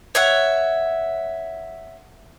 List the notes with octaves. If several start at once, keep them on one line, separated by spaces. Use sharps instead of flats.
C#5 E5 F#5